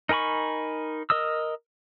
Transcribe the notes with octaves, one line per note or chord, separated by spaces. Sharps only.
D#4 A#4 G#5 B5 C#6
A#4 D#5 D#6 E6